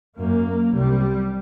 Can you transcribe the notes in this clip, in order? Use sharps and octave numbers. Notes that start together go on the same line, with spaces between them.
F#2 A#3
C2 C3 G3